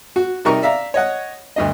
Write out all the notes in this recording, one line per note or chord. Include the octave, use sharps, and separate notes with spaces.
F#4
C3 G3 D#4 A#4 A#5 C#6
D5 E5 F5 A#5
C#5 D#5 F#5
D2 G2 D#5